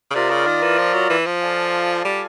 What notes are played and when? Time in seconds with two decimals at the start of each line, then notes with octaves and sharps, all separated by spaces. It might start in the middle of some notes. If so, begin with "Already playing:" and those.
0.11 C#3
0.15 C3 F4 A#4 D5
0.31 C#3
0.47 D#3
0.62 E3
0.78 F3
0.94 F#3
1.10 E3
1.26 F3
1.41 F4 A4 D5 F5 G#5
2.05 G3